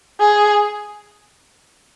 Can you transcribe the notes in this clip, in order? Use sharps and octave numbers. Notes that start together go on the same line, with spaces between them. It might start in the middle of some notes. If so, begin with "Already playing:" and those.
G#4